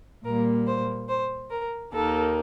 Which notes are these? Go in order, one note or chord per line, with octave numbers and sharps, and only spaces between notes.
A#2 G3 A#3 A#4
C5
C5
A#4
D#2 D#3 A#3 A4